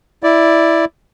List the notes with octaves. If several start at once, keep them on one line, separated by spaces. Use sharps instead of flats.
E4 D5